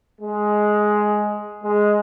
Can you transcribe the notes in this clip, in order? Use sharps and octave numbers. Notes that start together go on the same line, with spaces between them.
G#3
G#3